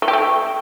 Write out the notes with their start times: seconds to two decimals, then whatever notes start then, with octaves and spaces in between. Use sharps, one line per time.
0.02 A3
0.08 G4
0.13 A3